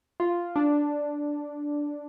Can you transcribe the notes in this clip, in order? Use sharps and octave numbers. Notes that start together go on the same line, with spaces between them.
F4
D4